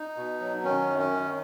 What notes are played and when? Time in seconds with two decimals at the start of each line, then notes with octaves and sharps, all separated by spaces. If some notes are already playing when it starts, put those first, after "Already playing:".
Already playing: D#4
0.17 B2
0.40 F#3
0.64 D#3 C#4
0.87 F#2
0.99 C#4
1.11 D#3